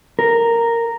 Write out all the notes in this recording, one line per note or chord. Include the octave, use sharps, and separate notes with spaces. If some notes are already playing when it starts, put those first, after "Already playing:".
A#4